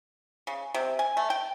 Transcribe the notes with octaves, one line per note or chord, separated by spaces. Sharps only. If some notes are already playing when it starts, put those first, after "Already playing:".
C#3
C3
G#5
A3
G5